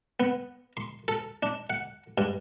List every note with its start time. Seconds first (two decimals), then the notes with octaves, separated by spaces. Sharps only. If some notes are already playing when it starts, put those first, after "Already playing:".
0.20 B3
0.77 C6
1.08 A4
1.43 D4
1.70 F#5
2.18 G2